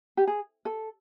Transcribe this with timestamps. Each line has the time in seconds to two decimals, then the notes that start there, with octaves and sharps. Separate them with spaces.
0.17 G4
0.27 G#4
0.65 A4